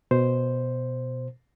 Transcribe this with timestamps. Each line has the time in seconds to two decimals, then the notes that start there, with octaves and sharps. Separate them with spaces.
0.11 B2 C5